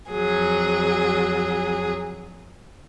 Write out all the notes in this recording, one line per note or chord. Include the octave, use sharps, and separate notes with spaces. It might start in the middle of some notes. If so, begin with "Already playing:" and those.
F2 F#3 G#4